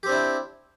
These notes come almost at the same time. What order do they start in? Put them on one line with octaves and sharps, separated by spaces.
G4 C4 D4 E4